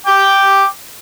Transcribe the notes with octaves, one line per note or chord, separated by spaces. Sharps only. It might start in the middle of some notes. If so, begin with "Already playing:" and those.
G5 D6